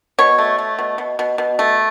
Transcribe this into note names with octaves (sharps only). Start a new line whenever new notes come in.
B2 C#5
A3
A3
B2
B2
B2
B2
A3